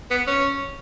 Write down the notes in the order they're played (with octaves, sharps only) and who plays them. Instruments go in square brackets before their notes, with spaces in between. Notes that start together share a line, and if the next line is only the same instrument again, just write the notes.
[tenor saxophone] B3
C#4